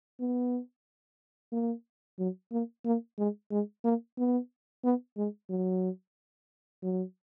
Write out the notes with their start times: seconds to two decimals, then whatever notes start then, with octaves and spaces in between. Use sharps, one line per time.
0.20 B3
1.52 A#3
2.19 F#3
2.52 A#3
2.85 A#3
3.18 G#3
3.51 G#3
3.84 A#3
4.18 B3
4.84 B3
5.17 G#3
5.50 F#3
6.83 F#3